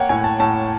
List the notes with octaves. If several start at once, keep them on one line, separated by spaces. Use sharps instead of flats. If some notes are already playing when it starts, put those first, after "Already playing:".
Already playing: A#3 C#5 F#5 G5
A2 G#5
A5
A2 A5